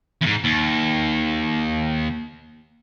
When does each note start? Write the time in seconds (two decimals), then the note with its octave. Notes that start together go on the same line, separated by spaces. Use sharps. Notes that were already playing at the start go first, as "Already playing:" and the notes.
0.22 E2 G#2
0.45 D#2